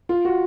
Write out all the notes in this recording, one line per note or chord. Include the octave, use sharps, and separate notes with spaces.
F4
F#4